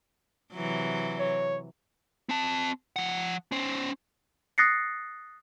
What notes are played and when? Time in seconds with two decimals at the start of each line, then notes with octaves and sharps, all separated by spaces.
0.54 C3 E3 F#3
1.19 C#5
2.29 C4 A5
2.96 F3 F#5
3.52 C#4 C5
4.58 D#6 F#6 A6 A#6 C7 C#7